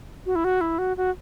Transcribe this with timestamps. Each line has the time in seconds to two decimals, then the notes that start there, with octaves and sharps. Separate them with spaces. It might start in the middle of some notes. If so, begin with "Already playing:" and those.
0.26 F#4
0.36 E4
0.44 F#4
0.61 E4
0.79 F#4
0.97 F#4